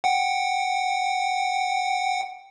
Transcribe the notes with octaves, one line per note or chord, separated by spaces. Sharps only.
F#5 G5